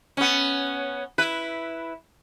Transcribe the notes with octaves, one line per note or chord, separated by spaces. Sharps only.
B3 C#4
E4 B4